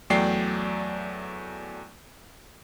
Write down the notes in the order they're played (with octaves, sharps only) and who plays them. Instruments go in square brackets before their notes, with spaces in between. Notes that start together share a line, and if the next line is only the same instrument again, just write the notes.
[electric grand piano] E2 F#3 A3 D5 G5 C7